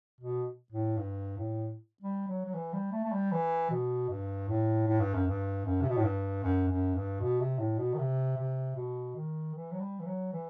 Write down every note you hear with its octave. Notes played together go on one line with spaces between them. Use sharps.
B2
A2
G2
A2
G3
F#3
F#3
E3
G3
A3
A3
G3
E3
B2
G2
A2
A2
G2
F#2
G2
F#2
C3
B2
A2
G2
F#2
F#2
G2
B2
C3
A2
B2
D#3
C3
C3
B2
D#3
E3
F#3
G3
E3
F#3
E3